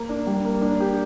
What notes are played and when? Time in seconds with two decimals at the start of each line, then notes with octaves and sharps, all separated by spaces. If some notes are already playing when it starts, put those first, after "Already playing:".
Already playing: A#3
0.09 D4
0.27 G3
0.45 A#3
0.62 D4
0.80 G4